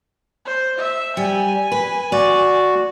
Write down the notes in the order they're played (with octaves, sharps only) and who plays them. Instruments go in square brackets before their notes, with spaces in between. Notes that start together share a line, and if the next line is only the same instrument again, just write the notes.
[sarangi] C5
E5
[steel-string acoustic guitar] G3 [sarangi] G#5
[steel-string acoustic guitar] B4
[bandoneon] F#4 [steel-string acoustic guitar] D5